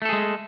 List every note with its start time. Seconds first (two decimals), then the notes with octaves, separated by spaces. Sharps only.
0.02 A3
0.05 A4
0.09 G#4
0.13 G#3